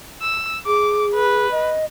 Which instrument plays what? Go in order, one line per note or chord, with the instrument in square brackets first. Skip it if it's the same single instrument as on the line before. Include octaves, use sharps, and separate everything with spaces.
[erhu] E6
[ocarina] G#4 [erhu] D6
[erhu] B4
[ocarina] D#5